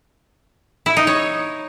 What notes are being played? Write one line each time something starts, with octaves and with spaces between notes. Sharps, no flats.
E4
D#4
C#5